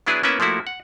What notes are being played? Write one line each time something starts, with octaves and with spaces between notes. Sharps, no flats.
F#3 B3 D4 E4 G#4 B4
A#3 B3 C#4 E4 B4 E5
F3 A3 A#3 E4 F#4
F#5